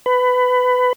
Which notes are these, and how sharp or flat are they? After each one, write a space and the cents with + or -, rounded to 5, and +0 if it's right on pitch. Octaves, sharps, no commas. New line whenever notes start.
B4 +20